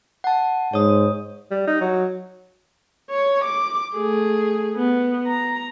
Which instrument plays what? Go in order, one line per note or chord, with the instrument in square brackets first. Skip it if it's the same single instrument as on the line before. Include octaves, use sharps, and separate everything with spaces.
[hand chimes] F#5 A5
[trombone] G#2 [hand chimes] C#5 D#6
[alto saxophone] G3
D#4
F#3
[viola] C#5
D6
A3 G#4
B3
A#5